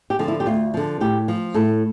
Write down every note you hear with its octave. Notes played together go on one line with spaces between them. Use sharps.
G4
D3 F3
E4
G4
D2 F4
D3 F3
A2 G4
F3
A2 A4